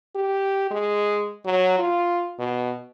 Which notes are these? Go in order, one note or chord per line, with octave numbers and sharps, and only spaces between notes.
G4
G#3
F#3
F4
B2